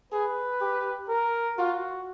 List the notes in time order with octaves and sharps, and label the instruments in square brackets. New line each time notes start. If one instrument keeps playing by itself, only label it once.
[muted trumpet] G#4 [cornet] B4
[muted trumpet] G4
[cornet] A#4
[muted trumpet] F4 [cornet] F#4